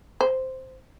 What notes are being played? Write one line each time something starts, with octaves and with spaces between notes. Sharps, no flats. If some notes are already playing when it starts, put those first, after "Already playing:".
C5